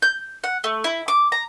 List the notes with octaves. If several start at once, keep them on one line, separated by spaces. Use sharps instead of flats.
G6
F#5
A3
E4
D6
A#5